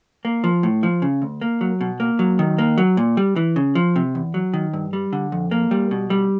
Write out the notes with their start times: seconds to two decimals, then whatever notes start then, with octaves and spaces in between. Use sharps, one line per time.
0.25 A#3
0.44 F3
0.63 A2
0.83 F3
1.02 C#3
1.22 D2
1.41 A#3
1.61 F#3
1.81 B2
2.00 A#3
2.19 F#3
2.39 D#3
2.58 A#3
2.78 F#3
2.97 A#2
3.17 G3
3.36 E3
3.56 C#3
3.75 F3
3.96 C3
4.15 E2
4.34 F#3
4.54 D#3
4.73 G2
4.93 G3
5.13 D3
5.32 F2
5.51 A#3
5.71 G3
5.91 B2
6.10 G3